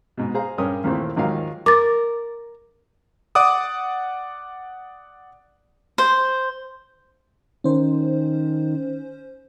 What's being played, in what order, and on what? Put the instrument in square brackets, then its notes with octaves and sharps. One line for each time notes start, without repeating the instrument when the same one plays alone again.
[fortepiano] G#2 B2
G#4 C5 F5 A#5
G2 C#4 A#4 D#6
D#2 A#2 D#3 E3 A3 C4
D#2 G#2 D#3 F3 F#3 F5
[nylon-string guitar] A#4 [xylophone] D6 A6
[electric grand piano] D5 F#5 D6 D#6
[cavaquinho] C5
[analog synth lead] D#3 [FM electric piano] C#4 C5